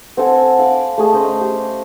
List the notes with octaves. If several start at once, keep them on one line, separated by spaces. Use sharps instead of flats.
C4 A4 F#5 G#5
F5 B5 D6
A3 G#4 D#5
C#4 C5 D#5
G4